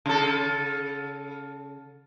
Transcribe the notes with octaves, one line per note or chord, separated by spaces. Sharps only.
C#3 A4